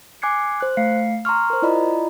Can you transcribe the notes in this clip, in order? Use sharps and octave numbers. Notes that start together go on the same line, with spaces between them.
G#5 D6 F#6 G#6 C7 C#7
C5 F#6
A3 F5 C7 C#7
A#5 C6 C#6 F6
A#4 C5
E4 F4 D5 D#5 A#5 B5